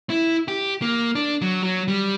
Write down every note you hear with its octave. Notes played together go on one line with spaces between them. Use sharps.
E4
G4
A#3
D4
F#3
F#3
G3